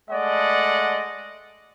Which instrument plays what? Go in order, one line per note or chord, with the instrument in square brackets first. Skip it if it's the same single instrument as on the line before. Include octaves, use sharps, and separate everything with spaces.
[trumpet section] G#3 A3 D5 D#5 F#5